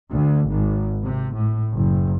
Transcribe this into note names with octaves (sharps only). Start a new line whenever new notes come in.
D2
G#1
C3
A2
F#1